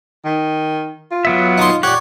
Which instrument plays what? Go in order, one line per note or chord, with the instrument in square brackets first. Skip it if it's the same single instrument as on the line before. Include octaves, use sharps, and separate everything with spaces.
[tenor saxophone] D#3
F4
[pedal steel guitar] F#3 B3 E5
[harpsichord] D#4 C6
[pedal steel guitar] G4 F#5 [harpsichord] C#5 D5